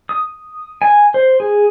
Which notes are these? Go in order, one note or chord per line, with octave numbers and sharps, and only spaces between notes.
D#6
G#5
C5
G#4